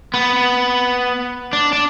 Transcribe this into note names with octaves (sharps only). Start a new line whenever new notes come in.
B3
D4
D4